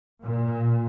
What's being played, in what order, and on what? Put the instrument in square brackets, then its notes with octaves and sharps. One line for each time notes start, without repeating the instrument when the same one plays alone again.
[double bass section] A#2